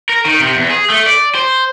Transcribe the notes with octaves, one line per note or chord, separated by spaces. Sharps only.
A#4
D#3
C3
E2
G#4
A3
D5
C5